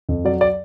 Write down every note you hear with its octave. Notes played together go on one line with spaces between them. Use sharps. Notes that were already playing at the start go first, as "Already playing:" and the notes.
F2
F#3 D5
D5